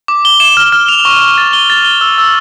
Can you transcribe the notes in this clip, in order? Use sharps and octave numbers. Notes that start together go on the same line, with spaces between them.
D6
G7
E7
F6
F6
F7
C#6
C#6
A6
G7
A6
G7
E6
E6